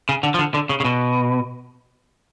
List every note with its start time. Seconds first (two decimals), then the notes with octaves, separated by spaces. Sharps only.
0.09 C#3
0.23 D3
0.34 F3
0.39 D3
0.54 D3
0.69 C#3
0.80 C#3
0.85 B2